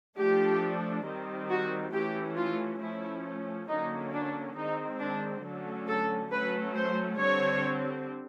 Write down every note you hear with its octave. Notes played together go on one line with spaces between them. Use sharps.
F3 A3 D4 G4
D#3 G3 C4
F#4
E3 A3 C#4 G4
F4
F3 A3 C#4 E4
D3 F#3 A#3 C#4 D#4
D4
D#3 G#3 C4 D#4
D4
D3 F#3 A3 C#4
A4
F#3 A3 C#4 B4
C5
D3 G3 C4 C#5